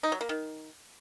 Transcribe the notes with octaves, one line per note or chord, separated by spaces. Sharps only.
D#4
F#3
A#3
D#3